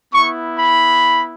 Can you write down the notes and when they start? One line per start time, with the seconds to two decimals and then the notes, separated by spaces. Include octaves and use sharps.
0.12 B3 E4 C#6
0.57 B5